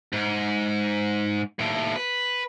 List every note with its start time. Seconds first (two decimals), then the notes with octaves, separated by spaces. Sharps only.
0.13 G#2
1.59 D#2 A2
1.96 B4